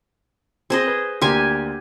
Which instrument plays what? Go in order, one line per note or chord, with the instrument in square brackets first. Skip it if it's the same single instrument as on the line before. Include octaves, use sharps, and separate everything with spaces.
[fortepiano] C4 [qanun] G#4 C5 D#5
[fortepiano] B4
[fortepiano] D2 A#3 C6 [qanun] G4 G#5